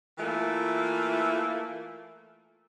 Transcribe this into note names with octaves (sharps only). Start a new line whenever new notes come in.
E3 A3 A#3 E4 F4